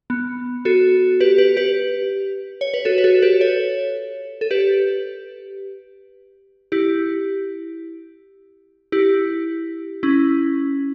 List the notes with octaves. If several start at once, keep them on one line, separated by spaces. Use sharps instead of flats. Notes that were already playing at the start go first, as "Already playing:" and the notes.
B3
F#4 A4
G4 B4
G4 B4
G4 B4
C#5
B4
F#4 A4
B4
F#4 A4
G4 B4
A4 C#5
A4
G4 B4
E4 G4
E4 G4
C#4 E4